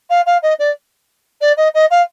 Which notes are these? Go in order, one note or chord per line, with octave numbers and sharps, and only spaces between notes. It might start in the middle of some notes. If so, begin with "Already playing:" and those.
F5
F5
D#5
D5
D5
D#5
D#5
F5